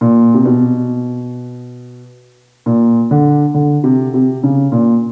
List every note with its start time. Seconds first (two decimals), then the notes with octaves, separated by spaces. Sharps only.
0.01 A#2
0.34 C3
0.45 B2
2.66 A#2
3.11 D3
3.54 D3
3.84 C3
4.14 C3
4.43 C#3
4.72 A#2